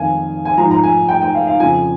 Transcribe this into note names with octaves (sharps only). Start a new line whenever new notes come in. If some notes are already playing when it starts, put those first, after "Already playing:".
Already playing: F2 D#3 F5 G#5
G#5
G#2 F3 A#5
A#5
G#5
G5
G5
F5
F5
F2 C#3 F3 G#5